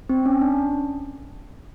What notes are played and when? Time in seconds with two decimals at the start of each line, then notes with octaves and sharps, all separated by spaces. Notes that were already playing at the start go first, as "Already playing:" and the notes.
0.09 C4
0.26 C#4
0.41 D4